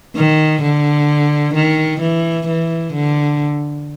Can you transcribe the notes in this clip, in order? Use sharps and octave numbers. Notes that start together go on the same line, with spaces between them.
D#3
D3
D#3
E3
E3
D3